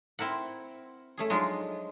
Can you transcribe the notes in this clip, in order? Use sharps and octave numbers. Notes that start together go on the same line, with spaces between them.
C4 E4 A#4 F#5
A3 C#4 G#4
F3 F#3 G#3 D4 D#4 F4